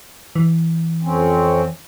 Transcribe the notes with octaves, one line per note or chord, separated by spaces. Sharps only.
E3
F2 C4 C#4